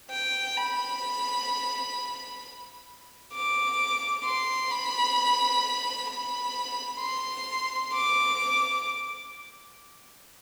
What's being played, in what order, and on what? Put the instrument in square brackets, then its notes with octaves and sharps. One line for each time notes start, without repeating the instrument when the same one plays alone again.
[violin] G5
B5
D6
C6
B5
B5
C6
D6